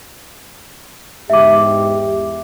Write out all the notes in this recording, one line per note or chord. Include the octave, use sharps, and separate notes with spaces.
E2 G#2 G4 E5 D6